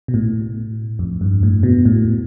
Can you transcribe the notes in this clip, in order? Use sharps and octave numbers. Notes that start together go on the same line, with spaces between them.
B2
A2
F2
G2
A2
B2
A2